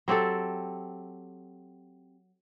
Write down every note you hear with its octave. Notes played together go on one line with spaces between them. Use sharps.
F#3 C4 G4 A4